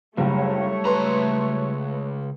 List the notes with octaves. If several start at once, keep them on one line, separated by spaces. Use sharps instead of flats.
F#1 C#2 F#2 G3 A3 C#5
C#2 B4 A#5 C6